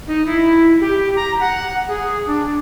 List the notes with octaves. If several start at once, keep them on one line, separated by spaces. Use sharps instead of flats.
D#4
E4
G4
A#5
F#5
G#4
D4